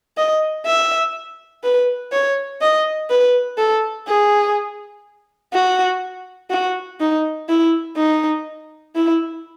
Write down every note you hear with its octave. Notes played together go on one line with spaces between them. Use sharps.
D#5
E5
B4
C#5
D#5
B4
A4
G#4
F#4
F#4
D#4
E4
D#4
E4